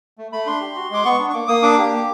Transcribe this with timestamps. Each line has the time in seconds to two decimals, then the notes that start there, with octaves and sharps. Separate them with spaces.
0.18 A3
0.32 A3 B5
0.46 D4 C6
0.61 G4
0.76 F#4
0.90 G#3 D6
1.05 B3 C#6
1.19 D4
1.30 C#6
1.34 A#3 D6
1.48 A#3 D#6
1.63 D4 D6
1.78 G4
1.93 A#3